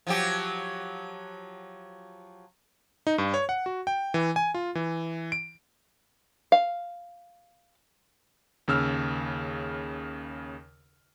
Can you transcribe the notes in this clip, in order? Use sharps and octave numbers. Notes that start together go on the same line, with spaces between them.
F3 F#3 G4
D#4
G2
C#5
F#5
F#4
G5
E3
G#5
F4
E3
D7
F5
D#2 C#3 E6 F6